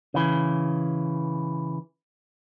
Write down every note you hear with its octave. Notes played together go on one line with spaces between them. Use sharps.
C#3 E3